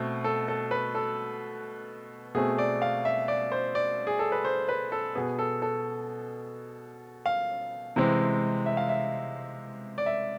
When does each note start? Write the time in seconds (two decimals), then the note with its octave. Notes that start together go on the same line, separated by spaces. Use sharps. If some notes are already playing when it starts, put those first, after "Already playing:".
Already playing: B2 A3 C4
0.24 A4
0.48 A4
0.71 B4
0.95 A4
2.35 B2 A3 C4 G#4
2.58 D5
2.82 F5
3.05 E5
3.28 D5
3.52 C5
3.75 D5
4.07 G#4
4.19 A4
4.32 B4
4.45 C5
4.68 B4
4.92 A4
5.15 B2 B3 G#4
5.39 A4
5.62 A4
7.26 F5
7.96 C3 E3 G#3 C4
8.66 E5
8.77 F5
8.89 E5
9.98 D5
10.06 E5